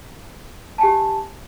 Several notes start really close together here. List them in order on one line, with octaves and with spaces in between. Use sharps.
A5 G#5 G4